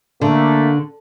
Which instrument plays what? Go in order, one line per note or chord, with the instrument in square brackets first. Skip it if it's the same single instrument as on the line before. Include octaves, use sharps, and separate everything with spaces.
[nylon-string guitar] D3 [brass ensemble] A3 A#3